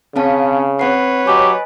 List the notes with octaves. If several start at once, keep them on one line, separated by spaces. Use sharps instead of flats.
C#3 C4 C#4 F5 A5
C4 B4 C#5 F#5 C7
F#3 G4 D#5 G#5